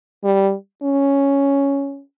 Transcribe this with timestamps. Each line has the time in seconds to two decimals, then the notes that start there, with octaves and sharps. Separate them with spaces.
0.24 G3
0.82 C#4